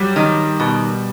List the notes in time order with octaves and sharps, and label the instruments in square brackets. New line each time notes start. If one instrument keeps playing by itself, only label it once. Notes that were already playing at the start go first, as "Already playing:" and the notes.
Already playing: [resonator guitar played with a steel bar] F#3 [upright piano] G3
[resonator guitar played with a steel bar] D#3
B2